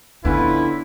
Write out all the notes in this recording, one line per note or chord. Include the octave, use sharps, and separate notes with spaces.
D3 B3 C#4 E4 F4 B4